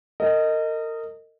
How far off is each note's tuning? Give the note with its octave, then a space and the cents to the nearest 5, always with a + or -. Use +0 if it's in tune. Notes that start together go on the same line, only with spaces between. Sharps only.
A#4 -35 D#5 +0